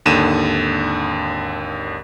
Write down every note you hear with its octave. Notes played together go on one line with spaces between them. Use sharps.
G#1 D#2 D3 D#7 E7